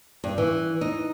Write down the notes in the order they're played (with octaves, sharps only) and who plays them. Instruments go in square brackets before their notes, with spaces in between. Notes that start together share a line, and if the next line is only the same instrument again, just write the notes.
[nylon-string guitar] G2
E3
D#4